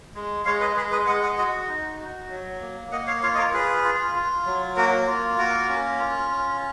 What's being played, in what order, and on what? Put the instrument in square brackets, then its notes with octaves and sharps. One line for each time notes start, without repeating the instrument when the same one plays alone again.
[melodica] G#3
G#3 C#5 F5
B4 D#5
G#3 G#4 B4
B4 D#5
G#3 D#5 F#5
D#5 F#5
F#4 D#5 F#5
D#4
F#4
F#3
A#3
A#3 D#5 F#5
C#5 F5
F4 C#5 F5
D#5
A#4 C#5
F4 G#4 B4
F4
F4
F#3
A#3 F#4 A#4
F4
A#3 F#4 A#4
C#4
F4
C#4